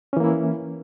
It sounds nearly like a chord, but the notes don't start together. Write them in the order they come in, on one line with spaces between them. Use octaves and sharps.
C#4 E3 A#3 E4